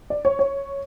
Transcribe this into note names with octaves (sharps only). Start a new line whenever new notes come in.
D5
C#5
C#5